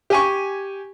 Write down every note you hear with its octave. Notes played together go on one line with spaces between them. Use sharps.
G4 G#5 C#6